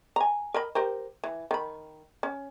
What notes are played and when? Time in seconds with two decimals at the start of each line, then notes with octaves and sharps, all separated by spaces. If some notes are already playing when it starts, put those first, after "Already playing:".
0.16 G#5 A#5
0.54 A#4 D#5 B5
0.75 G4 A#4 C5
1.24 E3
1.51 D#3 B5
2.23 C#4